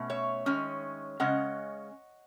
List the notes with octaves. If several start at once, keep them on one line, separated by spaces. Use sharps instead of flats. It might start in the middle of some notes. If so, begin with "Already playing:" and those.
Already playing: B2 A3 C#4
C#5 E5
D#3 G#3 C#4
C#3 G#3 C#4 D#5 F#5